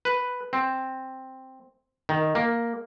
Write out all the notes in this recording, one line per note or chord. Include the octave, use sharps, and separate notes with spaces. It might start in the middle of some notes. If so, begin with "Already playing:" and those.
B4
C4
D#3
A#3